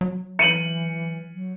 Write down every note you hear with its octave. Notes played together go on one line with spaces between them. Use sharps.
F#3
E3 C#7 D#7 F#7
F#3